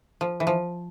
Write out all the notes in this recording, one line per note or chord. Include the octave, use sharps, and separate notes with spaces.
F3
E3
F3